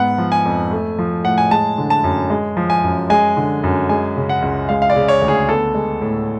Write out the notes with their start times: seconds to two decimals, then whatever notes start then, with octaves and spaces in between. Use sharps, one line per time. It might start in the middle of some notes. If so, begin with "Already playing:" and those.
Already playing: G#2 B3 F#5
0.18 F3
0.32 G#5
0.45 F2
0.71 A3
0.99 F3
1.24 A2 F#5
1.38 G#5
1.51 G#3 A5
1.78 D3
1.90 A5
2.04 F#2
2.30 G#3
2.57 F3
2.70 G#5
2.84 F#2
3.10 G#3 G#5
3.37 D3
3.64 F#2
3.89 G#3 G#5
4.17 C#3
4.29 F#5
4.42 C#2
4.69 G#3 F5
4.82 F5
4.90 D5
4.96 C#3
5.08 C#5
5.22 D2
5.28 G#4
5.49 B3 A4
5.75 G#3
6.01 A2